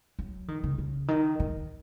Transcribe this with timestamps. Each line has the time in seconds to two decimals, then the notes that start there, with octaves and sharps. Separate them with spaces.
0.19 F#3
0.48 D#3
0.64 C#3
0.78 C#3
1.08 D#3
1.40 D#3